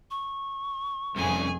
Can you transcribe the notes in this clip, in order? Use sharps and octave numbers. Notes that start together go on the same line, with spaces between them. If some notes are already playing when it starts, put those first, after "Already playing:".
C#6
F1 C2 F2 C#3 G#4 G#5